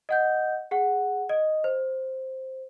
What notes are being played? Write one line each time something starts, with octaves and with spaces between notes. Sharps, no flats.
D#5 F#5 G6
G#4 F#5
D#5
C5